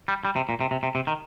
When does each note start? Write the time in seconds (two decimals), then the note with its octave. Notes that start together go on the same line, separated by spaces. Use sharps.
0.08 G3
0.25 G3
0.36 C3
0.49 A#2
0.61 C3
0.71 C3
0.83 C3
0.95 C3
1.07 D#3